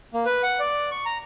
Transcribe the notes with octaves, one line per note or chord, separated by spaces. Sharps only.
A#3
B4
F#5
D5
C#6
A#5